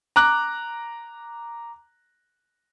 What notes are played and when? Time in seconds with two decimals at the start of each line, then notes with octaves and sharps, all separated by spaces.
0.16 A#5 D6 F#6